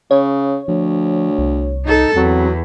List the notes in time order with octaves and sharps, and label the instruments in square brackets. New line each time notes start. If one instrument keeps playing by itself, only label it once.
[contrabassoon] C#3 [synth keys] C#5
[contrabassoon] D2 [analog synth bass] F3
[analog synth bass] C2
[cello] D#4 A4
[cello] E2 [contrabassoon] F#3 [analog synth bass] C4